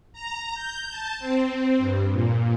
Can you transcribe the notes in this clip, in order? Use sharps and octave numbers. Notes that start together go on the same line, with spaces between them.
A#5
G6
A5
C4
G2
A#2